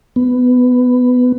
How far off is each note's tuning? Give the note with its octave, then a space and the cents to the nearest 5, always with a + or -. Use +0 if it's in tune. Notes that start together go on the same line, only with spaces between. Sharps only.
B3 +15